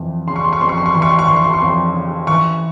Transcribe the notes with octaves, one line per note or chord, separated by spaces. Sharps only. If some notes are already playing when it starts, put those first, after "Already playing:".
Already playing: F2 E3
C#3 C6
C#6
C6
C#6
F2 C6
C#6
C6
C#6
E3 C6
C#6
C6
C#6
E3 C6
C#6
C6
C#6
F2 C6
C#3
E3 C#6